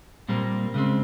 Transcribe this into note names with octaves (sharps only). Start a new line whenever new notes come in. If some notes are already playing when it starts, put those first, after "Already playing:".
A#2 G3 A#3 C4
C#3 G#3 C4